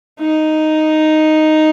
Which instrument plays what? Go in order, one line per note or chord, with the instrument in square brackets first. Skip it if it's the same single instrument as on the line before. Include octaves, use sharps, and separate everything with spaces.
[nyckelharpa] D#4